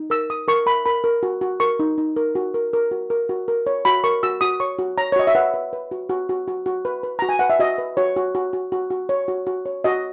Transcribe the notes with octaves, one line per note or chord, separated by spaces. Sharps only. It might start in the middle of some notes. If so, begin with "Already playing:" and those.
Already playing: D#4
A#4 E6
A#4 D#6
A#4 C#6
A#4 B5
A#4 B5
A#4
F#4
F#4
A#4 C#6
D#4
D#4
A#4
F#4
A#4
A#4
F#4
A#4
F#4
A#4
C#5
F#4 B5
A#4 C#6
F#4 E6
F#4 D#6
C#5 C#6
F#4
C#5 A#5
C#5
F#4 D#5
E5
B4 F#5
B4
B4
F#4
F#4
F#4
F#4
F#4
B4
B4
F#4 A#5
G#5
B4 F#5
E5
F#4 D#5
B4
F#4 C#5
F#4
F#4
F#4
F#4
F#4
C#5
F#4
F#4
C#5
F#4 D#5